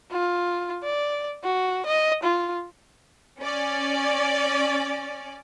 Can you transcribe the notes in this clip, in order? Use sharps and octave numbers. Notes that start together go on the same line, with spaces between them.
F4
D5
F#4
D#5
F4
C#4 D5